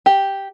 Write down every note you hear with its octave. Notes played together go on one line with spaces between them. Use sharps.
G4